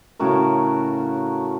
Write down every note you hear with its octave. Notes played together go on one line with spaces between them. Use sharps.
A2 C#3 F#4 A#4